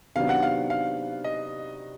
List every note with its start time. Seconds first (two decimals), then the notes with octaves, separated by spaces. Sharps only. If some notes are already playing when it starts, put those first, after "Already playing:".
0.16 C3 D#3 F#3 B3 D4 F5
0.29 F#5
0.43 F5
0.70 F5
1.24 D#5